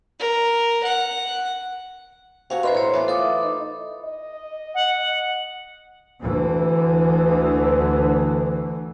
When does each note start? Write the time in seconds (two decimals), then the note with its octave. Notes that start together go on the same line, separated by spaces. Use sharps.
0.20 A#4
0.84 F#5
2.50 C3 C#4 F#4 C#5 F5
2.63 B2 D4 A#4 C5 E5 B5 C6
2.75 A2 C5 C#5
2.93 E3 A3 B3
3.08 F4 A4 D6 D#6
3.44 D#4
4.05 D#5
4.74 F#5
6.22 D2 E3